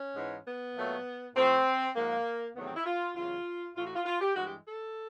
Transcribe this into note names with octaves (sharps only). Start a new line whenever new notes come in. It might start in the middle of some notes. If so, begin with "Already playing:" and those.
Already playing: C#4
G#2 E3 G#3
B3
A#2 F#3 A3
A2 F3 A3 C4
G#2 F3 G#3 A#3
E2 C3 D#3 F#3 A3 B3
C4
E4
F4
E2 C#3 F#3 F4
A2 E3 A3 F4
F#4
F4
F4
G4
G2 E3 G#3 F#4
G4
A4